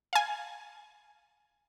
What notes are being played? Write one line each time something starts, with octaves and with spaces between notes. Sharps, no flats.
F5 G#5